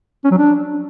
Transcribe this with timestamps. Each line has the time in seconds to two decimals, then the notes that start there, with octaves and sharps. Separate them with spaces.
0.24 C#4
0.31 F#3
0.38 D4